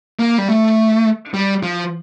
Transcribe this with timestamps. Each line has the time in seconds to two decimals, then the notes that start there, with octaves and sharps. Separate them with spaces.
0.19 A#3
0.38 G3
0.48 A3
1.34 G3
1.63 F3